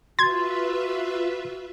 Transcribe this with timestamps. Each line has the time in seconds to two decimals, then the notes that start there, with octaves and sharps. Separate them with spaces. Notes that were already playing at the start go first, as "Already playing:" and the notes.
0.19 F4 F#4 B4 E5 C6 G#6 A6